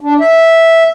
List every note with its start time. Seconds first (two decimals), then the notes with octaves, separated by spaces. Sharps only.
0.01 D4
0.21 E5